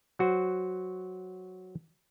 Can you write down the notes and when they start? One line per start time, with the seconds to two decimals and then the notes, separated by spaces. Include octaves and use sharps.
0.19 F#3 F#4 C5